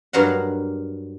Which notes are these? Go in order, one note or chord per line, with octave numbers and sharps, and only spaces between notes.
G2 F#3 A#4 F5 F#5